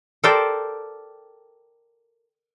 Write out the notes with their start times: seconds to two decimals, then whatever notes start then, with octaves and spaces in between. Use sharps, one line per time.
0.24 A4 A#4 C5 D5 G5